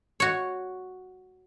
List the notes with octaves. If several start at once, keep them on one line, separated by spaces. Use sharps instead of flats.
F#4 C#5